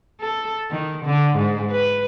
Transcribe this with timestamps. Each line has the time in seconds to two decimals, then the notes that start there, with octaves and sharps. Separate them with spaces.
0.21 A4
0.70 D#3
1.06 D3
1.36 G#2
1.70 B4